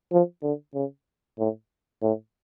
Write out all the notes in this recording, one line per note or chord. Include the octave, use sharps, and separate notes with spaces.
F3
D3
C#3
A2
A2